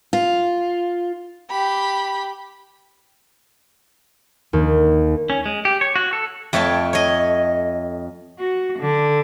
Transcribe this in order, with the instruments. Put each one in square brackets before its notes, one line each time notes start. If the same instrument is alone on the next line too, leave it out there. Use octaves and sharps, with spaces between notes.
[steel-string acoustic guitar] F4
[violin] G4 B5
[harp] D#2
[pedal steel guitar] C#4
G#3
G4
C#5
F#4
A4
[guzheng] F2 A3 C#5 G5 A5
C#5 D#5
[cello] F#4
D3